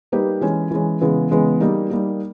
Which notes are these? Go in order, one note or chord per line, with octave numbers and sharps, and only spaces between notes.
G3 A#3 D#4 G4 B4
E3 G#3 C#4
E3 G#3 C#4
C#3 E3 G#3 B3
C#3 E3 G#3 B3
G3 A#3 D#4
G3 A#3 D#4